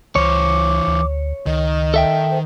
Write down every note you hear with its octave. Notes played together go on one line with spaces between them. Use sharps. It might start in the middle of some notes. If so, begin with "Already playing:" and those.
C#2 E3 C5 C#5 D6
D2
C#2 D#3 D#5
A4 E5 G5
C5